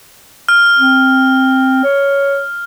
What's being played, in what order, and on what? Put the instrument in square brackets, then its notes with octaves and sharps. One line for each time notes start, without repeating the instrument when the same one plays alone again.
[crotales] F6
[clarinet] C4
C#5